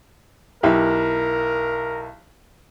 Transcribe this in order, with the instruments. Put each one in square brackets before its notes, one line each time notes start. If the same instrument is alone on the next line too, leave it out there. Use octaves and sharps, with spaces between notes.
[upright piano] B1 E4 G4 [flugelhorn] A#4